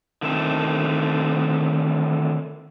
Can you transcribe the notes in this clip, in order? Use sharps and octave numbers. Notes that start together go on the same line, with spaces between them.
D3 D#3 A3 C4 A5